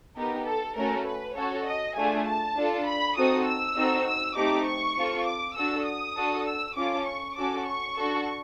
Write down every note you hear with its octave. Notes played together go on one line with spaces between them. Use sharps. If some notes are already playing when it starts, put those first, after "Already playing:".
B3 D#4 G4 A#4
A4
A3 C#4 F#4 A4 A#4
B4
C#4 F#4 A4 C#5
D#5
A3 D4 F4 G#4 G#5
A5
D4 F4 A4
B5
C4 D#4 F#4 A4 D#6
E6
C4 D#4 F#4 A4
E6
A3 C4 D#4 G4 D6
C#6
C4 F4 A4
D6
D4 F#4 A4 E6
D#6
D4 F#4 A4
E6
C#4 F4 A4 D6
C#6
C#4 F#4 A4 D6
C#6
D4 F#4 A4